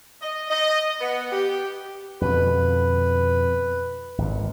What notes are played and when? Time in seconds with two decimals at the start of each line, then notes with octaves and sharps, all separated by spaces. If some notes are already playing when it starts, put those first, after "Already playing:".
0.22 D#5
0.50 D#5
1.00 B3
1.33 G4
2.21 F2 B2 D3 B4
4.18 G#1 A#2